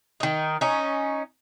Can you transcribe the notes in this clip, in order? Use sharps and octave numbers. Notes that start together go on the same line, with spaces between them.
D#3 D#4
C#4 D#4